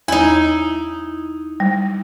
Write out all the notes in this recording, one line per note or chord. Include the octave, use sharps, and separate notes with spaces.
E2 D#4 E4
G3